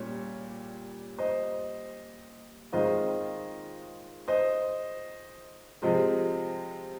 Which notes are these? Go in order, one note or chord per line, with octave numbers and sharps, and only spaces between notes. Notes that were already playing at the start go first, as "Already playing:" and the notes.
Already playing: A#2 G3 C#4 C#5
C5 D#5
D#3 G#3 C4 F4 C5 D#5
C5 D#5
C3 F3 G#3 C5 D#5